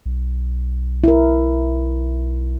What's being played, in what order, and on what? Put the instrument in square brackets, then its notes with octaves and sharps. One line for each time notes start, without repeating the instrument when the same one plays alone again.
[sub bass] B1
[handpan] E4 A#4